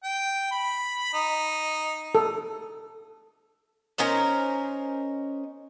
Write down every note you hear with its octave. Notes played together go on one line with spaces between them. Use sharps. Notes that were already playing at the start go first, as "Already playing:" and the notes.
G5
B5
D#4
A4
C#4 D#4 A#4 C5